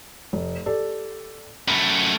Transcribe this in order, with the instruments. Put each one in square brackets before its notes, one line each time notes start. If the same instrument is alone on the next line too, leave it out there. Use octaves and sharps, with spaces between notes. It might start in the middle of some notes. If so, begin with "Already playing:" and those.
[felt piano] F1
G4 A4 D5
[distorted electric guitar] F#2 A3 [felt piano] B5